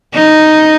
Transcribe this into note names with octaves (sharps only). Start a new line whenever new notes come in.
D#4